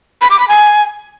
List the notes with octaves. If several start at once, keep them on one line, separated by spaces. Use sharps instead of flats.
B5
D6
B5
G#5